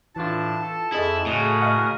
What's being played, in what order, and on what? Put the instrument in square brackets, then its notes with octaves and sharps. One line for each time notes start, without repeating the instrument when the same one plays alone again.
[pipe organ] A2 D4 [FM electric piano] E3 F4 [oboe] A5
[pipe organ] A4
[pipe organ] F2 [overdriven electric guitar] E4 [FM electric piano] G#4 A4 D#5
[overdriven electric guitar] A2 [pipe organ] C#3 F#4 D#6
[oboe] A#4 [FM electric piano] D#5 F5 F#5